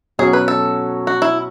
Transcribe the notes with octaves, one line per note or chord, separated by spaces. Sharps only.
B2 F#3 C#4 F#4 G#4
B4
A4
F#4
E4